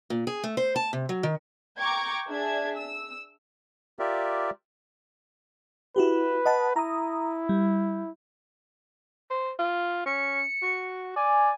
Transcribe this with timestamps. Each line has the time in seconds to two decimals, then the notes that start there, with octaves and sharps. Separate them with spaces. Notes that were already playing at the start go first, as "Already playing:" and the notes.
0.10 A#2
0.27 G#4
0.44 A3
0.57 C5
0.76 A5
0.93 C3
1.09 F#3
1.23 D#3
1.79 G5 A#5 C#6 D6 G#6
2.28 D4 G#4 E5 G#6
2.76 E6
3.99 F4 G4 A#4 D5 E5
5.96 E4 F#4 G4 B4
6.46 D#5 F#5 A5
6.76 E4 A#5 D#6
7.49 G3
9.30 C5
9.59 F4
10.06 C#4 C#7
10.62 F#4
11.16 D5 G#5